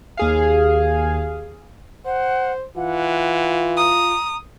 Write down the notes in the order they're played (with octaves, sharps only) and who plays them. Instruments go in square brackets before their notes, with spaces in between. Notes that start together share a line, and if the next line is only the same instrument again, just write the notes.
[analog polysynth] D#2 G#4 F5
[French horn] C5 [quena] F#5
[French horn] E3 [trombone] F4 [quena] F#5
[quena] A#5 [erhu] D#6